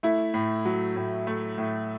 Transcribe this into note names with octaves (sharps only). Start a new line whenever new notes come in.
A3 E4
A2
F#3
A2
A3
A2